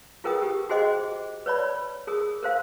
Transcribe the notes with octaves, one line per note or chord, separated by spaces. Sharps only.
F4 G#4 A#4 B4 G5 D#6
G4
F#4 G#4 C5 D#5 G5 D6
B4 C#5 D5 B5
G#4 A#4 D#6
A#4 C5 F5